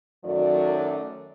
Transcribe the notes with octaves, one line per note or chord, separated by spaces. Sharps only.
F#2 D#3 F#3 A3 D5